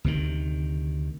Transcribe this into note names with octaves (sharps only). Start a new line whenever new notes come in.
D2 C3 D#3